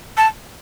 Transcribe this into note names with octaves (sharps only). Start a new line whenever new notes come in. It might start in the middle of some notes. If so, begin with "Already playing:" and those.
A5